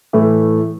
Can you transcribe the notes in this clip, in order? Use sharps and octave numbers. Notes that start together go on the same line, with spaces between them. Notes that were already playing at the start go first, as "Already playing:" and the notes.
A2 E3 A3